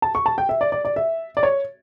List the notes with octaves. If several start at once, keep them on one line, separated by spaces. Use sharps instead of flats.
A5
C#6
A5
G5
E5
D5
D5
D5
E5
D5
C#5